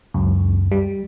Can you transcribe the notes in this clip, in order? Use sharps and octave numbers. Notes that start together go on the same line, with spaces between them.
C#2 F#2
G3